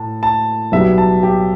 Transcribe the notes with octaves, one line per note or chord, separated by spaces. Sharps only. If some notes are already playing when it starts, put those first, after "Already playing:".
Already playing: A2 A5
A5
B1 B2 G3 E5
A5
G4